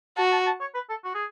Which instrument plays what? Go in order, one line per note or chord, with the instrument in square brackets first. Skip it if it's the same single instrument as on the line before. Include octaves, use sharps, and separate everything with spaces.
[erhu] F#4 [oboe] A5
[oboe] A5
A5
C#5
B4
A4
F#4
G#4